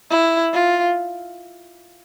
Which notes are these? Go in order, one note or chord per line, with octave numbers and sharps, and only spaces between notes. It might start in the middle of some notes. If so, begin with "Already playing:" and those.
E4
F4